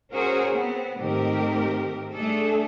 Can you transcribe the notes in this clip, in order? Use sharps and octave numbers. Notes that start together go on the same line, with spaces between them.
C#4 F#4 G#4 A#4 C5 C#5
B3 C4
G#2 D#3 A3 C4 G4 A#4
A3 D4 G#4 A4